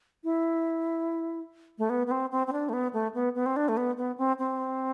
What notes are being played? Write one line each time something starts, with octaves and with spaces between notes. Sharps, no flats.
E4
A3
B3
B3
C4
C4
C4
D4
A3
B3
A3
B3
B3
C4
D4
A3
B3
B3
C4
C4